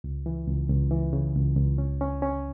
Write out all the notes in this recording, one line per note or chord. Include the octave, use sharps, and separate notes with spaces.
C#2
E3
C#2
C#2
E3
C#3
C#2
C#2
C#4
C#4
C#4